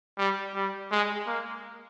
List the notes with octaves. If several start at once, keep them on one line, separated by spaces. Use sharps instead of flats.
G3
G3
G#3
A#3